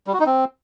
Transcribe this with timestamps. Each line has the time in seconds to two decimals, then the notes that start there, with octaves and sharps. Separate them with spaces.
0.07 G3
0.13 F#4
0.20 D#4
0.26 C4